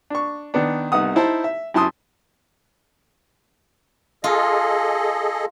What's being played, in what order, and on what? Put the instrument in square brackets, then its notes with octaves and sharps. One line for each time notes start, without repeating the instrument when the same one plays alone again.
[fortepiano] D4 C#6
D#3 B3 D4
C2 B3 D#4 F#5 D#6
D#4 E4 C5 A5
E5
F#2 E4 A5 C6 D#6
[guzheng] F4 [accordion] G#4 A4 D#5